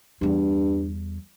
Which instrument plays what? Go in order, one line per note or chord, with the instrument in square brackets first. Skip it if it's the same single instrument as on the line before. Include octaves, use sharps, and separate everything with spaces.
[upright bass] E2 G3 [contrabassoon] G2